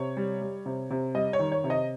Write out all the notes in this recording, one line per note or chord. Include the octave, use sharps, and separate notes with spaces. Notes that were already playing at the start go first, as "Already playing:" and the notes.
Already playing: C3 C#5
G3
G3
C3
C3
G3 D#5
C#5
D#3
C#5
C3
D#5